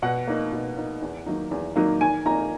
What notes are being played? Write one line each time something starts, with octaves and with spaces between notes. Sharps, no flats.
B2 F#5
A#3 D#4
B2
A#3 D#4
E2
D#3 F#3 A#3 D#4
E2
D#3 F#3 A#3 D#4
D#3 G#5
A#3 D#4 A#5